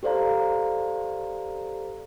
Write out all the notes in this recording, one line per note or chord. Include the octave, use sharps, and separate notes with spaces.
G4 A4 C5 D5 F5 A#5